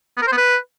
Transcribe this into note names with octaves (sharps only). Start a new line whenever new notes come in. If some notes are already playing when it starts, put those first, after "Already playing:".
B3
A#4
C5
B3
B4